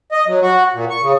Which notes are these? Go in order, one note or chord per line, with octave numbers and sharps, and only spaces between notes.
D#5
F#3
F#4
A#2
C#6
C#3